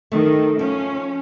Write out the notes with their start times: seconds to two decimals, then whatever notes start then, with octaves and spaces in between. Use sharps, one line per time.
0.12 D#3 A3
0.59 F3 C#4